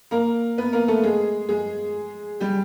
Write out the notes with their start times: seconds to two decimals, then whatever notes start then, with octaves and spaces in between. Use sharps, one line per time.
0.11 A#3 A#4
0.58 B3 B4
0.73 A#3 A#4
0.88 A3 A4
1.03 G#3 G#4
1.49 G#3 G#4
2.40 G3 G4